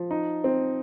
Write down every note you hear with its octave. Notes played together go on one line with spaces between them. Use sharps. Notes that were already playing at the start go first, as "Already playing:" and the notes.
Already playing: F3
D#4
C4